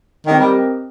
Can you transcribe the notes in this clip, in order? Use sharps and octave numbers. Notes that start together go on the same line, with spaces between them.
D#3 C4 G4 A#4 D#5 G5
G3